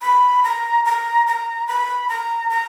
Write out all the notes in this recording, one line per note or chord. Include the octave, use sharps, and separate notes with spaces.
B5
A#5
A#5
A#5
B5
A#5
A#5